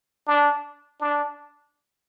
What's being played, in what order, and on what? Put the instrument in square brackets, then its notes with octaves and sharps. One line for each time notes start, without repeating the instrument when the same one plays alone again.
[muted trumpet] D4
D4